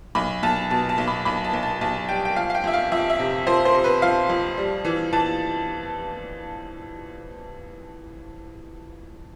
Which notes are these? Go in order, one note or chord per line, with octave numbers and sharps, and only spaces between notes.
B1 B5
B1 A5
B2 A5
A5
B1
B5
B1 B5
A5
B1
A5
B1 A5
G3 G5
G5
F3 F5
F5
G5
F2 E5
F5
F2 E5
E5
C3
F3 C5
C5
C3
B4
F3 F5
F2
G3
E3
E3 A5